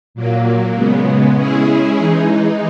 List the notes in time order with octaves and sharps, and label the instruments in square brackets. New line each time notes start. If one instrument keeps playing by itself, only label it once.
[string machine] A#2 F#3 A#3
C#3 G#3 B3
G#3 C#4 E4 G#4
E3 G#3 D#4